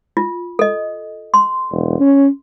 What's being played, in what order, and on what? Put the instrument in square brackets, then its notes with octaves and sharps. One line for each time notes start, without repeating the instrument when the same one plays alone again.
[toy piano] F4
A4 D#5
C6
[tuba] E1
C#4